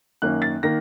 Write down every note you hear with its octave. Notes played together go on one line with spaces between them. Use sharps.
F#2 D#3 A#3 C#4 F#6
A6
D#3 A#3 A#6